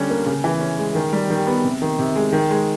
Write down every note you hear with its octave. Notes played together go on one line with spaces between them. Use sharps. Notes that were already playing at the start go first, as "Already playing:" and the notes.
Already playing: D3 G3 C#4
A#3
C#3
E3
C#4
G#3
D#3
G3
D#3
B3
C3
D#3
C3
G#3
D#3
G#3